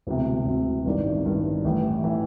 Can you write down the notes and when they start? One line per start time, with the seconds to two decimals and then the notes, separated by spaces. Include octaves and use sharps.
0.07 E1 D2 C3
0.46 E1 D2 C3
0.85 A1 G2 D#3 G3
1.25 A1 G2 D#3 G3
1.64 A1 A2 E3
2.04 A2 E3